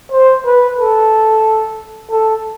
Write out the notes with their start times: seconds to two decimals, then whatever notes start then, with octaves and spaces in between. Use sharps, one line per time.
0.11 C5
0.46 B4
0.78 A4
2.11 A4